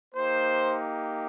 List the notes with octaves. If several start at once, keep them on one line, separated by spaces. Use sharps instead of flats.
A#3 D#4 G4 C5